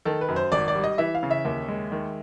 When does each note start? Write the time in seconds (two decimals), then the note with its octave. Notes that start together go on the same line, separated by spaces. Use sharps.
0.05 D#3 A4
0.21 B4
0.28 F#2
0.36 C5
0.52 G#1 D5
0.68 D5
0.75 G3
0.84 D#5
0.98 E3 E5
1.15 F5
1.23 C#3
1.31 E5
1.45 D#2
1.68 G#3
1.92 D#3